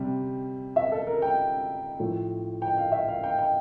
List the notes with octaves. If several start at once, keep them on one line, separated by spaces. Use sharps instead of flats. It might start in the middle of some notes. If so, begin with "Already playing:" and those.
Already playing: C3 G3
E5
A4
A#4
G5
A2 F3
G5
F5
E5
F5
G5
G5